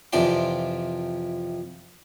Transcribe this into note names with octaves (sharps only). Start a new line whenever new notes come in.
F2 C3 E3 F3 D5 C6